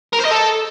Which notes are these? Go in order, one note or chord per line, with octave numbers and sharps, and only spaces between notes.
A#4
C5
D#5
A4